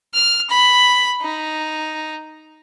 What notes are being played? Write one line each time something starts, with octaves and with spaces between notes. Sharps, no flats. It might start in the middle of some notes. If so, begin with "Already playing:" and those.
F6
B5
D#4